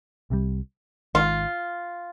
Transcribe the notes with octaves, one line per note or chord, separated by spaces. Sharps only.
C2 C3 E3 G3
G#1 G#2 D#3 F4